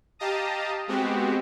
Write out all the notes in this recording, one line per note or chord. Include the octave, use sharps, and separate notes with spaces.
G4 D#5 F5 A5 A#5 D#6
G#3 B3 C4 F#4 G4